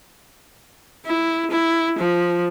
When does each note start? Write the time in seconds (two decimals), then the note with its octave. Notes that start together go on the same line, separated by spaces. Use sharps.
1.05 E4
1.51 E4
1.98 F3